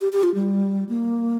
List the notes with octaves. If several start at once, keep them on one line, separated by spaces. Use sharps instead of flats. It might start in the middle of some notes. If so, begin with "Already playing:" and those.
G4
G4
F4
G3
A#3